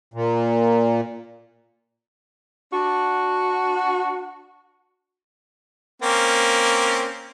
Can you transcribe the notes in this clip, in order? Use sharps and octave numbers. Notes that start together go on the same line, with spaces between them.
A#2
D4 F#4
A#3 C4 C#4